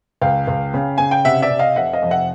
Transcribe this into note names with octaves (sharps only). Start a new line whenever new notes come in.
C#2 F5 G5
C#2
C#3
C#3 G#5
G5
C3 E5 F#5
D5 E5
C3
D#5 F5
F1 E5 F#5
D#5 F5
F2
E5 F#5